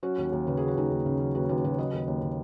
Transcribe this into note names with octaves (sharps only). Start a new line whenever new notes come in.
F#3 C#4 F#4
D#2
D#2
C#3 B4
F#3 G#4
F#4
D#2 D#4 G#4
D#2
C#3
F#3
D#2 F#4 B4
D#2 F#4 B4
C#3 F#4 B4
F#3 B4 D#5
D#2
D#2
C#3